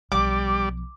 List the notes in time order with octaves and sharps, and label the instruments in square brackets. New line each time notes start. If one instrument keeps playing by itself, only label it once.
[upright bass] B1 F3 [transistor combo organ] G3 D5 [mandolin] D6